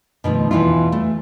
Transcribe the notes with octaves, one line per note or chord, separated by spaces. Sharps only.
B2 D#3 F3 A3
E2 B2 E3 E4 F4
A3